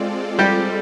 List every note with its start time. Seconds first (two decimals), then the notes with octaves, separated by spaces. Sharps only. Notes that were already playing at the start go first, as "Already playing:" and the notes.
Already playing: G#3 C4 F4 A4 D5
0.39 G3 G4